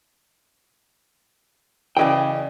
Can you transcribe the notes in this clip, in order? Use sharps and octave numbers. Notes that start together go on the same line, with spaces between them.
C#3 E3 D5 D#5 G5